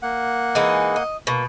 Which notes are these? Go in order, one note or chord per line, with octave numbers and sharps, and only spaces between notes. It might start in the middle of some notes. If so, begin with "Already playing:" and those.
A#3 F#5
E3 G#3 D#4
D#5
B2 A#3